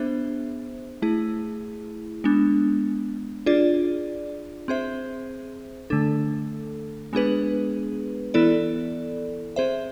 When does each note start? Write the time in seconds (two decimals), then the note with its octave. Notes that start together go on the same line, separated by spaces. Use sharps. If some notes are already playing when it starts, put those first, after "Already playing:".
Already playing: B3 D4 G#4 C5 E5
1.02 A3 E4 G#4
2.24 G#3 B3 D4
3.46 D4 F4 G#4 D5
4.68 C4 G#4 C5 E5
5.90 D3 A3 D4 A4
7.13 G#3 B3 D4 G#4 B4
8.34 E3 B3 E4 A4 D5
9.56 C4 G#4 C5 E5